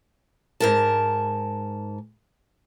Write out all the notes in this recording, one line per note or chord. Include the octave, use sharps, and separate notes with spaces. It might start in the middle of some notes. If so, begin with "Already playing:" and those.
G#2 A#4 A5